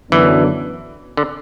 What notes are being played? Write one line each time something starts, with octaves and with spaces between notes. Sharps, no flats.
F#2 D3 E3 F#3 B3 D4
D3